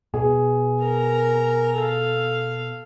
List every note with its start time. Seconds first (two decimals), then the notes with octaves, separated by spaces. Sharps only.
0.14 B2 G#4
0.84 A#4 A#5
1.78 A4 F5